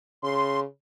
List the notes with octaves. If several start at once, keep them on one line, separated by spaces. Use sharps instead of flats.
C#3 C6